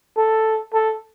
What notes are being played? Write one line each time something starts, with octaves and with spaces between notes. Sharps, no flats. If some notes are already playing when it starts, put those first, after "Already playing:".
A4
A4